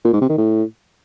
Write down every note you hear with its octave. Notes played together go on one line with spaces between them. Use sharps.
A#2
G#2
C3
D#3
A2